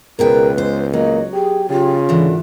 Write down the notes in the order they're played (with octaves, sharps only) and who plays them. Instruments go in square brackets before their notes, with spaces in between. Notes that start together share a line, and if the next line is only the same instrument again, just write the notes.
[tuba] C#2 [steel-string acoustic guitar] B2 G#4 G5 [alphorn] A#4 [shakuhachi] B4
[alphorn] G#3 [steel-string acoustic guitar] C5
[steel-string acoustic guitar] F#3 [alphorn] A#3 [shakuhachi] D#5
[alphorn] G4 [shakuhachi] G#4
[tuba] C#3 [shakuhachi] F4 [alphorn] G4
[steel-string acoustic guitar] G#2 E3 [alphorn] D3